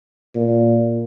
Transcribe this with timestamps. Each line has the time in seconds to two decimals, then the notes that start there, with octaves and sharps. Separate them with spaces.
0.35 A#2